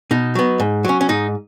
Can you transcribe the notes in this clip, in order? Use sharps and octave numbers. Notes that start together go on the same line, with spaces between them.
B2 D#4
F#3 B3
G#2
F#3 C#4
C#4
G#2 D#4